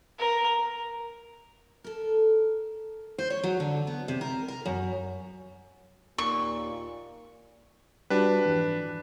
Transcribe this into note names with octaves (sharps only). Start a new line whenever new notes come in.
A#4
A4 A#4
C5
C#5
F#3
D3
B3
C3
A#4
A#4
F#2
D#2 A#2 C#6
G3 D4 F#4 G4 B4
F2 G#2 E3
D#2